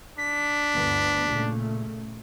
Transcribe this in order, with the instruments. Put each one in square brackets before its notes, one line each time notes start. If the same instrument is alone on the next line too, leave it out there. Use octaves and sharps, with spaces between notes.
[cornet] D4 [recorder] B6
[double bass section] G1 D2 B3
A#2 C#3 A3